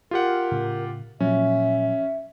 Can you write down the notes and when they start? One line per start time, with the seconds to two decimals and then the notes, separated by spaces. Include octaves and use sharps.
0.11 F4 G4 A#4 F#5
0.52 A2 C#3
1.20 A#2 F3 F#3 C#4 E5